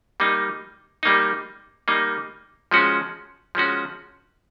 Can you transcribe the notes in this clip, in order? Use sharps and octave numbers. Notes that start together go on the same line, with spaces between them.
G3 A#3 D#4
G3 A#3 D#4
G3 A#3 D#4
F3 G#3 C#4 F#4
F3 G#3 C#4 F#4